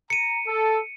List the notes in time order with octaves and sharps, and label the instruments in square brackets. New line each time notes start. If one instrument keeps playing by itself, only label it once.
[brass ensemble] A#5 [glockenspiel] C#7 D#7
[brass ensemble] A4